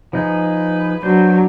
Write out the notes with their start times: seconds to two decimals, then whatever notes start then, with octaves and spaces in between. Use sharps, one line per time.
0.13 F3 D#4 G#4 B4
1.03 F#3 D4 C5